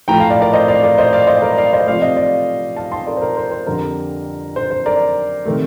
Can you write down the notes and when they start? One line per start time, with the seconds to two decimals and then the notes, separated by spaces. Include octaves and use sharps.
0.08 A2 F3 A3 G5 A#5
0.19 F5 A5
0.30 D5 F5
0.41 A#4 D5
0.53 C5 D#5
0.68 D5 F5
0.83 A#4 D5
0.98 C5 D#5
1.13 D5 F5
1.27 C5 D#5
1.42 A#4 D5
1.57 D5 F5
1.73 C5 D#5
1.87 C3 F3 A3 D5 F5
2.02 C5 D#5
2.17 D5 F5
2.76 F5 A5
2.92 A5 C6
3.06 A#4 D5
3.17 C5
3.22 A#4
3.37 C5
3.51 C5
3.67 F2 D3 G3 A#4
4.56 C5
4.71 C5
4.86 A#4 D5
5.45 C3 D#3 A3